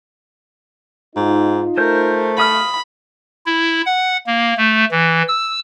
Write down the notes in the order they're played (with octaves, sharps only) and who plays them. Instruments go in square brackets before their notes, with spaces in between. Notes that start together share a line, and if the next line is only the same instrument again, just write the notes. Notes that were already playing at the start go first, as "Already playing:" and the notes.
[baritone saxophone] G#2 [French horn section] D#4 F4
[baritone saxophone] A3 [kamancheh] A#4 [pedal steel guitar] C5 G6
[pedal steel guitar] F5 D#6 F6 [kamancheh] B5
[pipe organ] E4
F#5
A#3
A3
E3
E6